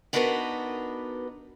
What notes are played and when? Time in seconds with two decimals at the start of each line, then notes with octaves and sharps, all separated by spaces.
0.13 B3 D4 D#4 F#4 A#4 B4